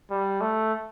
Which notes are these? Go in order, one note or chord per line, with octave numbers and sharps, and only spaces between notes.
G3
A3